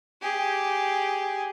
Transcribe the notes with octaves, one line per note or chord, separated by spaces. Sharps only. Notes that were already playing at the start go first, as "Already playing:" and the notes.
G4 G#4